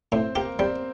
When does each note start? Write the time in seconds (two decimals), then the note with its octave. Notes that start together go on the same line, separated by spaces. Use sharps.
0.12 A2 C4 C5
0.36 A#3 G4 A#4
0.59 G3 C4 C5